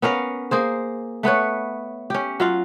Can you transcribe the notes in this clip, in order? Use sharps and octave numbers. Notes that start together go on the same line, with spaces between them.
B3 C#4 A#4 F5
A#3 G#4 C5
A3 B3 B4 C#5
C#4 G4
F#3 F4 F5